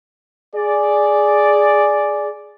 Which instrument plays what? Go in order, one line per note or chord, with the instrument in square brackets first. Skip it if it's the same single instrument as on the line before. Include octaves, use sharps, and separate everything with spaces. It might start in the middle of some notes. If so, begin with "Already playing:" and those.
[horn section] G#4 D5